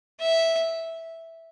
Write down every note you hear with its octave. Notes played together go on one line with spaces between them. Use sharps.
E5